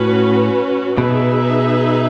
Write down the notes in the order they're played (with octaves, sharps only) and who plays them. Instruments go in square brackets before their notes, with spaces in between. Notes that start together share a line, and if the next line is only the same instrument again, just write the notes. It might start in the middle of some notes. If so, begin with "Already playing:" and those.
Already playing: [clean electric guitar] A2 [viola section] C#4 F#4 B4
[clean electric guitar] B2 [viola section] D#4 G#4 B4 E5